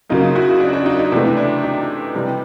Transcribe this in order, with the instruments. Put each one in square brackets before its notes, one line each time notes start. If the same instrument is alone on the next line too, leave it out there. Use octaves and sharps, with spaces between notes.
[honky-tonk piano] F#2 C#3 F#3 A#3 D#4 F4
E4 F#4
D4
D4
D#4
D#4
C3 E3 A3 D4 E4
D4 E4
D#4
C3 E3 G3